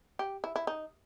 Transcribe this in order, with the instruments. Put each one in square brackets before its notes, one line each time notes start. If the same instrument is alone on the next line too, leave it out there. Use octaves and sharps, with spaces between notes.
[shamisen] G4
E4
E4
D#4